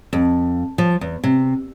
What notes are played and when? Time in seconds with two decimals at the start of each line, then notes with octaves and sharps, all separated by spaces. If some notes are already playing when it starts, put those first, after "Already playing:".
0.13 F2
0.78 F3
1.01 E2
1.24 C3